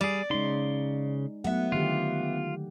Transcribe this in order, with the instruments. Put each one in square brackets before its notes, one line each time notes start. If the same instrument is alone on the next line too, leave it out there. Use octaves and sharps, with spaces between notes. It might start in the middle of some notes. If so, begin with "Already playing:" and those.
[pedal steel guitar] G3 G#4 [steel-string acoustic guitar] D5
[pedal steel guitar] C#3 C6 [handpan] G#3 D#4
[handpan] F#3 A3 F#5 [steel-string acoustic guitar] B3 E5
[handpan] D3 D#3 G4 [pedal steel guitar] F4